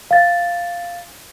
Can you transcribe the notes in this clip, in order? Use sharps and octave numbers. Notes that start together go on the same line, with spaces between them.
F5 A6